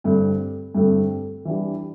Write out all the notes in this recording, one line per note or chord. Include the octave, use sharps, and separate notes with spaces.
G2 D3 A3 C4
G2 D3 A3 C4
E3 G3 D4 G4